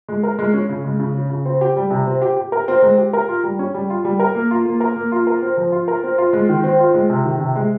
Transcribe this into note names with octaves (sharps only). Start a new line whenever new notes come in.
G#3
A#4
G#3
C#4
C#3
G#3
C#3
C#4
C#3
C4
G4
G3
C3
C4
G4
G4
A#4
C4
G#3
G4
A#4
F4
G3
C#4
G3
F4
G3
A#4
A#3
F4
A#3
A#4
A#3
F4
A#4
C4
F3
F4
A#4
C4
F4
G#3
D#3
C4
F4
G#3
C3
D#3
C3
G#3